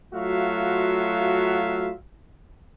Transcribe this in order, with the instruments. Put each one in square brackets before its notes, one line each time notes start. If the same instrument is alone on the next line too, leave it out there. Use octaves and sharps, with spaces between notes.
[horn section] F#3 A3 F4 F#4 E5 F5